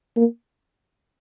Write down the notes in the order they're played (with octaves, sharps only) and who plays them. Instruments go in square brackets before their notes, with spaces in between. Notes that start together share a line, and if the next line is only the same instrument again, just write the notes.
[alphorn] A#3